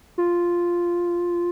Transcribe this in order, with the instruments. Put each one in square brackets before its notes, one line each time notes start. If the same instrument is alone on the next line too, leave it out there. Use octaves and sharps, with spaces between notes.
[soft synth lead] F4